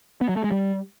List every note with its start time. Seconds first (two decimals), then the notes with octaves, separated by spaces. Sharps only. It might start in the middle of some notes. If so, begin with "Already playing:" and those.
0.21 B3
0.29 F#3
0.36 A3
0.44 G#3
0.52 G3